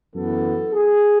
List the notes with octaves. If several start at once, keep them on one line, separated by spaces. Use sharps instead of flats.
F#2 E3 B3 A4
G#4